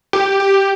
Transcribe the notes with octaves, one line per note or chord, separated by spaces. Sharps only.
G4
G4